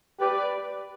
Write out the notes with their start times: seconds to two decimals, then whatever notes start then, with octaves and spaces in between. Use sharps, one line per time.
0.20 G4 B4 D5